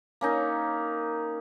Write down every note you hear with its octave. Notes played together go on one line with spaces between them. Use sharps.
A#3 C#4 D#4